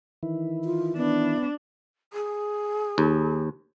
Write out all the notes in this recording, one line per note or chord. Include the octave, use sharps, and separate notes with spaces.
D#3 E3 E4
F4
B3 D4
G#4
D#2